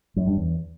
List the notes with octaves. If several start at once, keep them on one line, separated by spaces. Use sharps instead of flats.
F#2
G2
E2